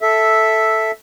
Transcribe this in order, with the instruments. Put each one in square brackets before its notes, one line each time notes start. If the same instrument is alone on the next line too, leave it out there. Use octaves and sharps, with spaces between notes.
[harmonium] A4 E5